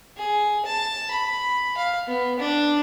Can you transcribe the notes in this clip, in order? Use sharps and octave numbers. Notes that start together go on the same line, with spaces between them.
G#4
A5
B5
F5
B3
D4